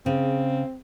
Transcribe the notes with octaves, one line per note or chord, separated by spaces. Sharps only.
C#3 C4